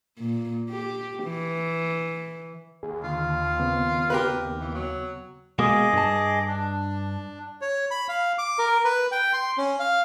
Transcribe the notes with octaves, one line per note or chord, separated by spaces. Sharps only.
A#2
G4
E3
D#2 G#4
D3 F4
C#3 B3 C4
G4 A#4 B4
E3
F#3
B2 G#3 A#3 G#4 D#5 D6
G2 A5
D4
C#5
B5
F5
D6
A#4
B4
G5
C6
C#4
F5